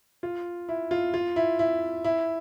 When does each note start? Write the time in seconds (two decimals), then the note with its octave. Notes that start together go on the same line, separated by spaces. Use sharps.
0.23 F4
0.69 E4
0.91 F4
1.14 F4
1.36 E4
1.59 E4
2.04 E4